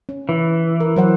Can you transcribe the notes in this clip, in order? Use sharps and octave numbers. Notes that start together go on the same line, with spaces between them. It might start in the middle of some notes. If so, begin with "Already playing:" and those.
C#4
E3
A#4
F#3 C5 F#5